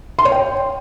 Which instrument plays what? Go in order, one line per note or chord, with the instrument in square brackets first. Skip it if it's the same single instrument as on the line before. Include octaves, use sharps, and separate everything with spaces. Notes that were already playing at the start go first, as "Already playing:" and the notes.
[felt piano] C6
C#5
G5